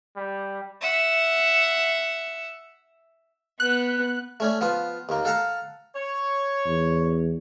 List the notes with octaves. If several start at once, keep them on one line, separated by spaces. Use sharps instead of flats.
G3
E5 F#5
B3 F#6
A3 C#4 D4
F3 B3 F4
D#2 A#3
A4 F5 F#5 A5 A#5
C#5
E2